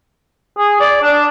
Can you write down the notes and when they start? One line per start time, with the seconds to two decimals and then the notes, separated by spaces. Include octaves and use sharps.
0.58 G#4
0.80 D5
1.02 D4